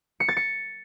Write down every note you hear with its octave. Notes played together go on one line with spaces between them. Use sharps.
C#7
A6
C#7